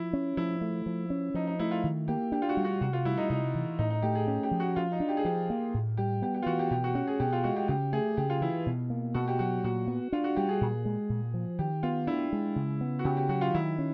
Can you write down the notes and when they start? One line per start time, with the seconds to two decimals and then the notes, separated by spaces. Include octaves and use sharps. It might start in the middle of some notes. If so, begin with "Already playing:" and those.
Already playing: F3 E4
0.13 C#4
0.37 F3 E4
0.61 A3
0.86 F3
1.10 C#4
1.34 F3 D#4
1.47 D#4
1.59 A3 E4
1.71 F4
1.84 D#3
2.08 A#3 G4
2.32 D4 G4
2.42 F4
2.49 F#4
2.57 G3
2.65 F#4
2.81 C3 F#4
2.93 F4
3.05 G3 E4
3.18 D#4
3.30 C3 D#4
3.54 E3
3.79 A2 D#4
3.90 D#4
4.02 A3 G4
4.15 G#4
4.27 C#4 G4
4.43 G4
4.51 F3
4.60 F#4
4.76 F3 F4
4.92 D#4
5.00 D4
5.08 G4
5.17 G#4
5.25 F3 G4
5.50 A#3
5.74 A2
5.97 G3 G4
6.22 B3 G4
6.34 G4
6.42 F4
6.46 E3 F#4
6.59 G4
6.71 B2 G4
6.84 F#4
6.95 C#4 F#4
7.07 G#4
7.20 B2 G4
7.33 F4
7.44 G#3 F#4
7.56 G4
7.68 C#3 G4
7.93 A3 G#4
8.17 C#3 G4
8.30 F4
8.41 E3 E4
8.66 B2
8.90 A#3
9.14 B2 F#4
9.28 G4
9.39 F#3 F#4
9.64 A#2 F#4
9.88 B3
10.12 D4 F4
10.24 F#4
10.36 G3 G4
10.49 G#4
10.61 A#2
10.85 G#3
11.09 A#2
11.34 F3
11.59 D#3 G4
11.83 B3 F4
12.07 D4 E4
12.33 G#3
12.56 C#3
12.81 B3
12.99 F#4
13.05 C#3 G4
13.17 G4
13.29 F#3 F#4
13.41 F4
13.54 D#3 E4
13.79 C#4